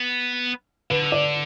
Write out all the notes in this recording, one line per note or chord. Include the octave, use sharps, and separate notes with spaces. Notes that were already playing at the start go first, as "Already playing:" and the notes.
Already playing: B3
D3 B4
D5